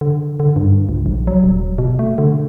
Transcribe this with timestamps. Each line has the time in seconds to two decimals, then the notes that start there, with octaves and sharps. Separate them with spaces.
0.01 D3
0.40 D3
0.56 G2
0.89 C#2
1.06 A#1
1.27 F#3
1.44 D#1
1.78 B2
1.99 A3
2.18 D3